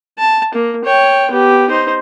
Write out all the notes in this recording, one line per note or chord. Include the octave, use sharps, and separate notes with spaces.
A5
A#3
C#5 G5
B3 G4
D#4 C5